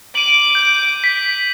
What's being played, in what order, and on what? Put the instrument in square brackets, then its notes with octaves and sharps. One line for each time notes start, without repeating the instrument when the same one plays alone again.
[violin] D6 [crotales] D#7 F#7
[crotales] G6
B6